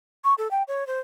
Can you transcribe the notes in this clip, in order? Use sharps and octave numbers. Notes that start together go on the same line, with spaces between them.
C#6
A4
G5
C#5
C5